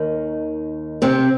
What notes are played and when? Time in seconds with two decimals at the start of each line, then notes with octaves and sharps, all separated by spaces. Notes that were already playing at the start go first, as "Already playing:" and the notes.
Already playing: D#2 D#3
1.02 C3 C4